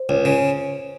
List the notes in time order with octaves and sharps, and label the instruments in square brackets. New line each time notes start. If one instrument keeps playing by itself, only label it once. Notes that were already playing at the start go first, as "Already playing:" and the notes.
Already playing: [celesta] C5
[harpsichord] C#2
C#3